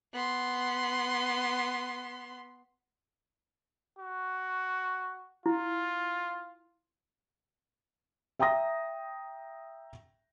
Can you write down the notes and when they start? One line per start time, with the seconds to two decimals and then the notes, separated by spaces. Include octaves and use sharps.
0.13 B3 C6
3.99 F#4
5.46 E4 F4
8.39 E5 G5 A#5 D#6 A#6